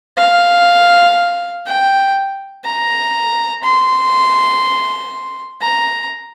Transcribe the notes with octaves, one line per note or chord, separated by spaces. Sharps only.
F5
G5
A#5
C6
A#5